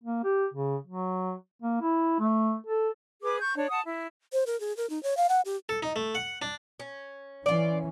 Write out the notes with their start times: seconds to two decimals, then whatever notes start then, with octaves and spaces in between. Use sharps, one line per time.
0.04 A#3
0.24 G4
0.54 C#3
0.87 F#3
1.62 A#3
1.81 E4
2.20 A3
2.66 A4
3.23 G#4 B4 D6
3.40 C#6 G6
3.55 D4 C#5
3.70 F#5 A5 D#6
3.84 E4
4.33 C5
4.46 A#4
4.60 G#4
4.77 A#4
4.90 D#4
5.03 C#5
5.17 F5
5.29 F#5
5.45 G4
5.69 A4
5.83 D#4
5.96 A3
6.15 F#5
6.42 D4
6.80 C#4
7.46 E3 C#4 F4 D5